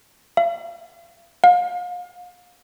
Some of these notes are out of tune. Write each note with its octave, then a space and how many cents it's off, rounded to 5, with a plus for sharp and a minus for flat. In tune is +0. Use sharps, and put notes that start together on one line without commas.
F5 -40
F5 +35